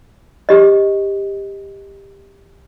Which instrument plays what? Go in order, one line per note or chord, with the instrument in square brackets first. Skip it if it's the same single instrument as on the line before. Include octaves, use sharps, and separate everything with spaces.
[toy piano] G4 D#5